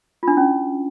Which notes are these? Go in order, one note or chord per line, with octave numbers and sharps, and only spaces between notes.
C#4 D4 E4 F4